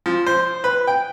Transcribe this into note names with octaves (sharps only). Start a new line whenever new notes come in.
F3
C5
B4
G5